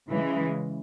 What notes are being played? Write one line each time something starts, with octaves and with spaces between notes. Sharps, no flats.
C#3 E3 G#3